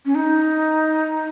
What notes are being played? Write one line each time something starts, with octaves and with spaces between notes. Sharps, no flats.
C#4
D#4